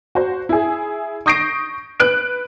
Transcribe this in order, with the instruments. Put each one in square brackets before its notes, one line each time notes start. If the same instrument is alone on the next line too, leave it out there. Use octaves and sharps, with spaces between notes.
[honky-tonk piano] F#4 C5
E4 G#4
C#6 D#6 G6 A#6 C7 D7
B4 F#6 D7